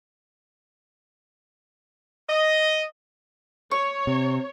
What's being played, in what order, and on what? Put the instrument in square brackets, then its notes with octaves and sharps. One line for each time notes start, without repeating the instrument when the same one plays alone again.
[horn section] D#5
[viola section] C#5 [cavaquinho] C#6
[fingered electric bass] C3